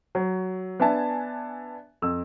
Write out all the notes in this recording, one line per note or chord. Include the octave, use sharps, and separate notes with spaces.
F#3
B3 D4 E5 G#5 A5
F2 E6